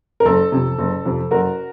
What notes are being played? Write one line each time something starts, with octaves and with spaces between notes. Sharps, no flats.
A#4
F#1 A4
F2 C3
F#1
F2 C3
F#1 F#4 A#4